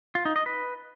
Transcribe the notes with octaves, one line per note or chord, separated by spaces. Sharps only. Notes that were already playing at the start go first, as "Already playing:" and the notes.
F4
D#4
D#5
B4